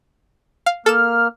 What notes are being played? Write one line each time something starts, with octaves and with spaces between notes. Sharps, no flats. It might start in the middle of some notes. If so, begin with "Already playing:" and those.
F5
A#3 A4 F6 E7